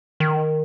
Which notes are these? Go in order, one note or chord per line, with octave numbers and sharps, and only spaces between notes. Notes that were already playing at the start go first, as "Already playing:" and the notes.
D#3